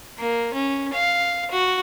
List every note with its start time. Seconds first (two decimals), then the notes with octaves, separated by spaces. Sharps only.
0.18 A#3
0.54 C#4
0.94 F5
1.51 F#4